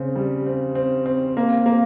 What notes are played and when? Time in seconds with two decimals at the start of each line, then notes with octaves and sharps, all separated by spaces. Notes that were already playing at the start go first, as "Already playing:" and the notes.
Already playing: C#3 C4
0.16 G3
0.46 C4
0.75 C4
1.06 C4
1.37 A#3
1.66 A#3